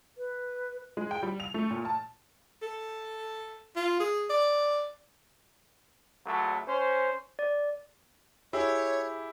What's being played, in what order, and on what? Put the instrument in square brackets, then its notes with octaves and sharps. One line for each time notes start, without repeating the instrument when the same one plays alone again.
[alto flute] B4
[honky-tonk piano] G#3
G5
G3
F7
A3
A#2
A5
[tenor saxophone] A4
F4
G#4
D5
[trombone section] C#2 F#3 A3
C#4 C5
[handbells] D5
[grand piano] E4 G4 G#4 [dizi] C#5